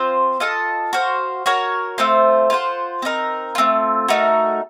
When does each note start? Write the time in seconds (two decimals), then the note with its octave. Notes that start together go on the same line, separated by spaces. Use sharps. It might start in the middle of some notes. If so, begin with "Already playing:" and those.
Already playing: C4 F4 C5
0.40 F4 A4 D#5 A5
0.93 F#4 C5 F5
1.46 F#4 A#4 C#5
1.98 A3 C4 F4 C5
2.50 F4 C5 F#5
3.02 C4 D#4 A#4
3.55 A3 C4 F4
4.08 A3 D#4 F#4 A#4